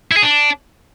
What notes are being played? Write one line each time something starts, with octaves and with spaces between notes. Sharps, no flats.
E4
G#4
D4